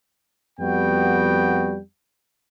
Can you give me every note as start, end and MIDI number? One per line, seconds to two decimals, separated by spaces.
0.60 1.78 41
0.60 1.78 55
0.60 1.78 59
0.60 1.78 66
0.60 1.78 79